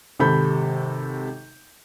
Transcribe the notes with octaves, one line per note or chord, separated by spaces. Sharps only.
G#1 C3 A4 B5 G6